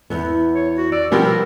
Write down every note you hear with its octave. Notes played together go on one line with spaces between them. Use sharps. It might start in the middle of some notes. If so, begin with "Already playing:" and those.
E2 B3
C#5
F#4
D5 E6
B2 F3 G3 B3 C4 G4 A#4